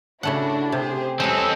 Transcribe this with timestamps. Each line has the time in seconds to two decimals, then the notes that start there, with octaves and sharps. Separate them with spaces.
0.23 C#3 A3 D4 E4 F#4 F#5
0.72 C3 G4 G#4 C5
1.20 G#3 C4 C#4 A4 B4 D#5